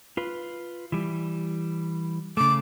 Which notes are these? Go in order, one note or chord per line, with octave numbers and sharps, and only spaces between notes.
F4 B4
E3 G3
C#3 A3 D6